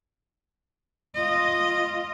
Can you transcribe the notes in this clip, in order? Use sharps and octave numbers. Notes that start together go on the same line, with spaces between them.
F4 D#5